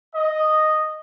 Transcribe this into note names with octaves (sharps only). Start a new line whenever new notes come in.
D#5